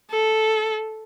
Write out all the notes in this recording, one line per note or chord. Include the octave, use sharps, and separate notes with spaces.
A4